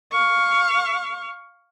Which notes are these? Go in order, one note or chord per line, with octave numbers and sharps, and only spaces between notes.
F5 C#6